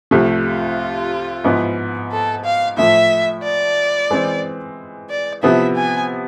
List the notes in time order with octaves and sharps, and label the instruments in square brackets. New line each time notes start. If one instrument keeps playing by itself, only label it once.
[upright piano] C2 C3 F3 A3
[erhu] F4
[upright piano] G#2 F3 B3 E4
[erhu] A4
F5
[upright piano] A2 F3 A3 [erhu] E5
[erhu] D5
[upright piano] E3 G#3 C4
[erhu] D5
[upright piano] C3 F3 B3 E4 [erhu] E5
[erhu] G#5